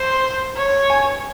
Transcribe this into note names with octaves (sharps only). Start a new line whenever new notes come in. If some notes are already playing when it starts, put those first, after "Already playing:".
Already playing: C5 C6
C#5
G#5